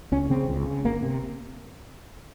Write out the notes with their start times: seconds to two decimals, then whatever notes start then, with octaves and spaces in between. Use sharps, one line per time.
0.12 C#2 C#4
0.30 C#3 C4
0.49 C#2
0.66 C#3
0.84 G1 A#3
1.03 C3